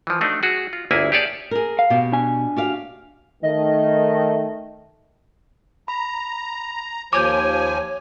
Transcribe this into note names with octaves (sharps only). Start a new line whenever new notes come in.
E3 F3
A3 D4 D#4 F#4
F#4 G#4
F4
G1 D2 A#3 E4 G#4 G#5
G4 G#4 C#5 D5 A5
G#4 A#4
F5
B2 G4
D4 G#5
F#4 G4 F5
D#3 A3 D#5
A#5 B5
D#2 F3 C#5 G#5 D6 G6